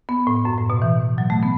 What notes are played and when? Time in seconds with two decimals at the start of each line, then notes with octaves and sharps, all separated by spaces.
0.09 B3
0.27 A2
0.45 F#2
0.58 A2
0.70 B2
0.82 E3
1.18 F#3
1.30 A3
1.43 B3